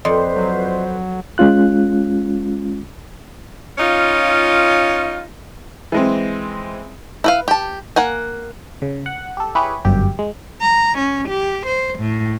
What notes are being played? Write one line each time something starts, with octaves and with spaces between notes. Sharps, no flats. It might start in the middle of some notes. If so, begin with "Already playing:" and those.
F2 F4 B4 C5 D5 D#5 C6
F#3
G#3 C#4 F4 F#6
C#4 D#4 F4
E3 G#3 C4
E4 B4 F5
G4 A5
A#3 F#5 G#5
C#3
F#5
G4 A4
E4 G4 G#4 B4 C#5
G1 F#2 G4
G#3
A#5
C#4
G4
C5
A2